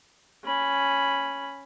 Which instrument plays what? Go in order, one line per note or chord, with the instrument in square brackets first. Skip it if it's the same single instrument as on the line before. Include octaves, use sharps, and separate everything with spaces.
[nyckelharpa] C#4 B5